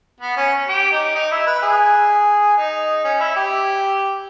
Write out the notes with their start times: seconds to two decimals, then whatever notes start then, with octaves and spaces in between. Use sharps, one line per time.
0.21 B3
0.37 C#4
0.69 G4
0.92 D#4
1.15 D#4
1.31 E4
1.47 B4
1.63 G#4
2.58 D#4
3.04 C#4
3.20 E4
3.36 G4